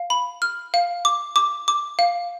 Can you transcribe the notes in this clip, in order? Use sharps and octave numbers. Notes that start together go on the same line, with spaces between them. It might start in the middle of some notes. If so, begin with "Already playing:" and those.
Already playing: F5
B5
F6
F5
D6
D6
D6
F5